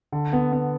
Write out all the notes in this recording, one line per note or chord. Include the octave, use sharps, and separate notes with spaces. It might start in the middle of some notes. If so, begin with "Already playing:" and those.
D3
B3
B3